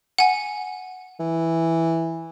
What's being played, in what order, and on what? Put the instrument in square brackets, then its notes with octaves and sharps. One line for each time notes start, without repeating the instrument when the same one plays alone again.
[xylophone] F#5 G#5
[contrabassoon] E3